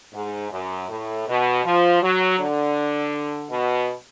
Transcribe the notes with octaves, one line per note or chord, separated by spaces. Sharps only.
G#2
F#2
A2
B2
F3
F#3
D3
B2